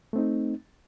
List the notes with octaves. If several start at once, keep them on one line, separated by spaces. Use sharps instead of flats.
A3 C4 D#4